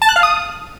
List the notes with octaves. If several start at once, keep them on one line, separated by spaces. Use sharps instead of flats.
A5
F#6
F5
D#6